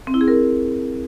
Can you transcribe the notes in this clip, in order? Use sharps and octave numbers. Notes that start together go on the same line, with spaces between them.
C4
E4
G#4
A#4